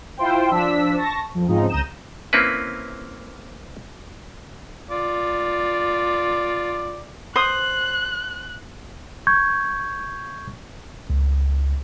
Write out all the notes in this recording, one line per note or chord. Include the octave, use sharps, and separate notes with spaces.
E4 F4 C5 G5
F3 D4 E6 B6
A5 C#6 A#6
F2
G#2 C#3 F3 C4 D#4
C#2 A#5 D#6 G6 E7
A#3 C4 C#4 E4 B4
F4 D5
C5 D#6 F#6
C#6 G6 G#6
C#2